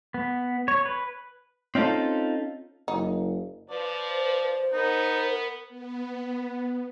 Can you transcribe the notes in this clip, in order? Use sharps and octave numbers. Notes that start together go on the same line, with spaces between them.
B3
C#5
B4
C4 C#4 D#4 F4 A4
F#1 D#4
F3 B4 D5
C5
B3 D#4 A#4
B3